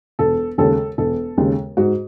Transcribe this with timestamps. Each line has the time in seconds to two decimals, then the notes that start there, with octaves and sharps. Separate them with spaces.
0.19 E1 A4
0.58 D#2 C#3 G#3 A4
0.98 E1 A4
1.37 D#2 C#3 G#3
1.77 G#2 F#4